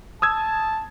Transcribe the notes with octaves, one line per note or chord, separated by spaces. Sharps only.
A5 D#6 E6 G#6